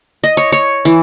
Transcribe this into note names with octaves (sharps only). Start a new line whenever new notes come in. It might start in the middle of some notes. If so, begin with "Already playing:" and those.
D#5
C#5
C#5
E3